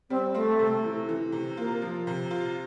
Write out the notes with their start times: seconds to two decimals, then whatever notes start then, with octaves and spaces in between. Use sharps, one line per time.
0.10 G3 C4
0.34 A3 C4
0.59 C3
0.84 E3
1.09 E3
1.32 C3
1.57 A#3 F4
1.82 F3
2.07 C3
2.31 F4